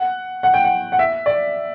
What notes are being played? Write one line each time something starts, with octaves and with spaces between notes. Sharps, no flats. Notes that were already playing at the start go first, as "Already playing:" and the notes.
Already playing: F#5
F#5
G5
F#5
F#5
E5
D5